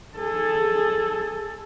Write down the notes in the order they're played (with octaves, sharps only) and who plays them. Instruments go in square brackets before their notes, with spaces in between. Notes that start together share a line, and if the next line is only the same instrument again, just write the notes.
[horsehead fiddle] G#4 A4